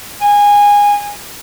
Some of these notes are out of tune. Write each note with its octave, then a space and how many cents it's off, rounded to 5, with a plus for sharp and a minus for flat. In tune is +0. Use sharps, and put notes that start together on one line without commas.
G#5 -20